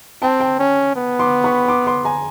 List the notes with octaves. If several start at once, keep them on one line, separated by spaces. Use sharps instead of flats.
C4 G5 A5
G5 A5
C#4
B3
C6 D6
B5 C#6
C6 D6
C6 D6
G#5 A#5